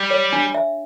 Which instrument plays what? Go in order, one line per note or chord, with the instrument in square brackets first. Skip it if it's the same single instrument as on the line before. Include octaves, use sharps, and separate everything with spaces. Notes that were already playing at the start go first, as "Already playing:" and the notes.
Already playing: [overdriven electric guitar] G3
[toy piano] C#5
D4
E5